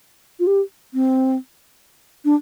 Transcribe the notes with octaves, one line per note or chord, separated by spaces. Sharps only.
F4
G4
C4
D4